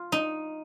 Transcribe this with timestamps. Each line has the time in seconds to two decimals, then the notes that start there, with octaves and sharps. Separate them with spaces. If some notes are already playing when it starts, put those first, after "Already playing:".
Already playing: F4
0.12 D#4